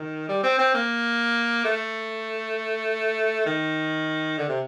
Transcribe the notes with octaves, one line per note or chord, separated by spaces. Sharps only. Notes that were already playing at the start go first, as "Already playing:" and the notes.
Already playing: D#3
G3
C4
C4
A#3
A3
D#3
D3
C3